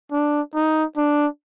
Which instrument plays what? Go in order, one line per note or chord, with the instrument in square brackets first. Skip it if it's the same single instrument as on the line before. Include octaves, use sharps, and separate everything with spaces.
[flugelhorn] D4
D#4
D4